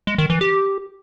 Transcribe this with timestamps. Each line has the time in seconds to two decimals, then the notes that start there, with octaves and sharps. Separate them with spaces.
0.07 G#3
0.18 D#3
0.30 E3
0.41 G4